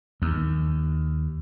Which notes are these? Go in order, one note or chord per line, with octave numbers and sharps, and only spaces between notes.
D#2